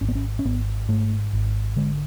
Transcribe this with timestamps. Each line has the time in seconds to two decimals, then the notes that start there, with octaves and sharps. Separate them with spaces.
0.01 G#1 C#4
0.08 B3
0.15 C#4
0.39 C#4
0.45 G#1 B3
0.88 G#2 A3
1.33 G#1
1.76 D3 G#3